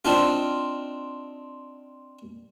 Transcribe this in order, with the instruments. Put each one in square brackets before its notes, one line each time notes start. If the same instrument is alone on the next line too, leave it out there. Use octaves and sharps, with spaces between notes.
[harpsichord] C4 D4 D#4 F4